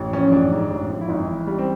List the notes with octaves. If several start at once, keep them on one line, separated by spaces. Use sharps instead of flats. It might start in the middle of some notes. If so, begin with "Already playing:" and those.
Already playing: A1
F3 C#4
A1 D4
G#2
A1
F3
E4
G#1 D#4
E3 E4
G3
C4